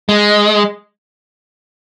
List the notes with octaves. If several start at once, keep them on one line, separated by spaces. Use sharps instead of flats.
G#3